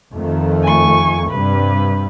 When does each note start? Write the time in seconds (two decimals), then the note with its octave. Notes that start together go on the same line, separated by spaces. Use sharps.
0.13 F2 D#3 A3
0.63 G#5 C#6
1.30 G2 C3 G3 B4